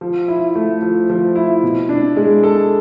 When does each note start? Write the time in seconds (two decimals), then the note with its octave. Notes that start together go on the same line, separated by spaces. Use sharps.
0.01 F3
0.28 E4
0.55 A3
0.82 F3
1.09 F3
1.35 E4
1.63 B2
1.89 D4
2.17 G#3
2.43 A4